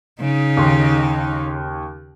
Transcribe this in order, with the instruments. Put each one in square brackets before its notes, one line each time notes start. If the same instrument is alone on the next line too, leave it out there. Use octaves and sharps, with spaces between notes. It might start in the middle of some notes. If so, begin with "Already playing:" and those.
[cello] C#3 D#4
[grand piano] D#2 C6